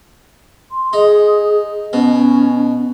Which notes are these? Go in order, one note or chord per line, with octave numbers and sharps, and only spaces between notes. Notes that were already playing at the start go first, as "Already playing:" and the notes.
C6
D#4 G#4
B2 C#4